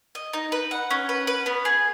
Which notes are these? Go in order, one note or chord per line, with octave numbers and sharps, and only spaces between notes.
D#5
D#4
B4
F#5
C#4
B4
B4
B3
G#4